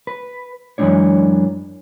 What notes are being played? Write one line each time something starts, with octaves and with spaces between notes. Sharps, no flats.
B4
F#2 E3 G#3 C4 D4 C#5